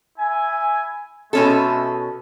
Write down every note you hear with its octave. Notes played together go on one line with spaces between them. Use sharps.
E4 G#5
B2 G#3 A3 C#4 A4